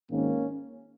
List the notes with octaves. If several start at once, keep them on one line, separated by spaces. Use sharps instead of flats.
G#1 G#2 D#3 A#3 C#4